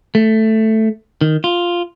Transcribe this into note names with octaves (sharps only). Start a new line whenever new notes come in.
A3
D#3
F4